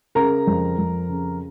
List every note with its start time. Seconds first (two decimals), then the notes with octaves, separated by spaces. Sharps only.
0.15 C#3 A#4 A#5
0.47 F2
0.78 F2
1.09 C#3